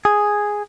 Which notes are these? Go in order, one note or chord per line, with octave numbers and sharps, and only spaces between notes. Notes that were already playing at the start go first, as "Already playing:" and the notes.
G#4